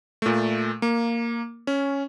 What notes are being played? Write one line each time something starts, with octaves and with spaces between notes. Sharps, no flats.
A#2 A3
A#3
C#4